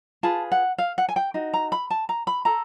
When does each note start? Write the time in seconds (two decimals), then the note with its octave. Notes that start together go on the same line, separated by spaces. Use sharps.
0.23 F4 G#4 B4 A5
0.52 F#5
0.78 F5
0.98 F#5
1.09 G#5
1.16 G5
1.34 D#4 F#4
1.54 A#5
1.72 B5
1.90 A5
2.09 A#5
2.27 B5
2.45 A4 A#5